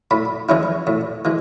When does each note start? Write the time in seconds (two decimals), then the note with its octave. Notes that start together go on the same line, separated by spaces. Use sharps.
0.11 A2 B5
0.49 E3 G#3 C#4 E4
0.87 A2
1.25 E3 G#3